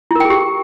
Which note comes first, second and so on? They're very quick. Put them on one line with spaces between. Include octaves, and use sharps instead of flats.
E4 A#4 G5 G#4 G4